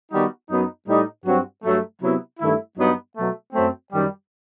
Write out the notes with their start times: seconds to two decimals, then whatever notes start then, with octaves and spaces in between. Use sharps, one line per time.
0.11 D#3 G3 B3 D#4 F#4
0.50 F#2 F#3 B3 D#4
0.88 A2 G3 D#4
1.26 G2 F#3 C4 F#4
1.63 G2 F#3 A3
2.02 C3 F#3 B3 E4
2.39 G2 D#3 A3 E4
2.77 G2 F#3 B3 D#4
3.16 B2 F#3 A3
3.53 F#2 F#3 A3 C4
3.92 F#2 D#3 G3